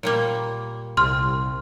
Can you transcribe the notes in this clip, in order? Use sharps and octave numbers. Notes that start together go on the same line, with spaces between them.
A#2 G3 A#3
C2 C6 F6